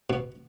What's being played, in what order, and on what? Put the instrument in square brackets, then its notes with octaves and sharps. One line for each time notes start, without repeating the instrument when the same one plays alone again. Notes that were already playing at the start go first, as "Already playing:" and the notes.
[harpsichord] B2